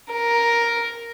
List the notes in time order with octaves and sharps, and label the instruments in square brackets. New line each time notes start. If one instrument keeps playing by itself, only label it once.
[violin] A#4